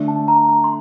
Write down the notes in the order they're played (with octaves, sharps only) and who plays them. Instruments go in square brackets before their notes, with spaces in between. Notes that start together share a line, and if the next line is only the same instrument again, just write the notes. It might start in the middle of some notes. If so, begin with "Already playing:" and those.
Already playing: [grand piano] D3 A3 D4
[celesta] A5
A#5
A#5
C6